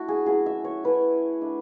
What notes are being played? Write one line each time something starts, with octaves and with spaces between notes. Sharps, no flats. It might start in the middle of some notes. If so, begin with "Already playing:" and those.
Already playing: A3 D4 E4 F#4
G#4
F#3 A3 C#4 E4 G#4
E5
C#5
A3 C#4 E4 B4
A3 D4